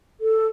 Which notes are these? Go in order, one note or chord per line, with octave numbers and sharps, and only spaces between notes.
A4